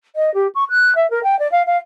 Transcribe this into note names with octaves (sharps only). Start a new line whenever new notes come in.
D#5
G4
C#6
F#6
E5
A#4
G5
D5
F5
F5